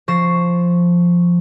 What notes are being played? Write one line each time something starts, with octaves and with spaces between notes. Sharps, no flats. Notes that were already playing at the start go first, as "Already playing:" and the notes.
F3 C#6 A#6 C7 E7